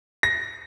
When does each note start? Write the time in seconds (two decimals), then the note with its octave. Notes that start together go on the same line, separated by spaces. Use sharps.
0.23 A#6